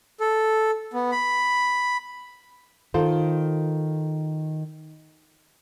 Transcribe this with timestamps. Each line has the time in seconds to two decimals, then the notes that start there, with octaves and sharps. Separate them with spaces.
0.20 A4
0.94 B3
1.12 B5
2.94 D#3 F4 A4 C5